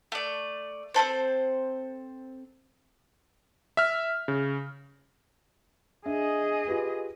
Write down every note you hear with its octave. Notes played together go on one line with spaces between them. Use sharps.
A3 D5
C4 C#4 A4 C5
E5 F6
C#3
D4 G#4 D#5 E5
F4 G4 B4